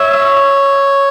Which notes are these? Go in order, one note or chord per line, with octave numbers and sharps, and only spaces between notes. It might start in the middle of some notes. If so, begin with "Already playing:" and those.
Already playing: C#5 E5